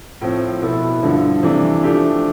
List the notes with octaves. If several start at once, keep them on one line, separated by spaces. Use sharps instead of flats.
A2 F3 C4
B2 B3 E4 A4
G2 D3 F3
C3 E3 A3 D4
F3 A3 D4 G4